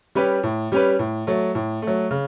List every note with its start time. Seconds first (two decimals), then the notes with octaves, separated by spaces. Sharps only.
0.15 G3 C#4 G4 B4
0.43 A2
0.72 G3 C#4 G4 B4
0.99 A2
1.27 F#3 A3
1.55 A2
1.82 F#3 A3
2.11 C#3